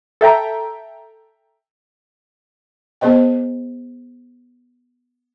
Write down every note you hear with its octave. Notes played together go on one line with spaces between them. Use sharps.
A4 E5 G5 A#5
B3 G#4 C5 D#5 G5